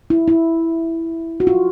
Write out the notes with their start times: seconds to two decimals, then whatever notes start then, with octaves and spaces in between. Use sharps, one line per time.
0.10 E4
0.28 E4
1.40 F#4
1.47 F4